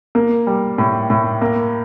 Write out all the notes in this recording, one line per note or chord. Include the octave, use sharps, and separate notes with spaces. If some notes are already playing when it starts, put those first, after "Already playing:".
A#3
G3
A2
A2
A#3